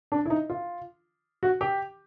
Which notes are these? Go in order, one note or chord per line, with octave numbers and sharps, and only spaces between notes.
D4
E4
D#4
F4
F#4
G4